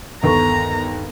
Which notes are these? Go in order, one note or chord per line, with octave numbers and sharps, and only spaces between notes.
G1 D#2 B3 A4 A#5 C#6